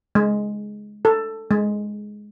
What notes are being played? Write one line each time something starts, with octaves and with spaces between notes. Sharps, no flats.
G#3
A4
G#3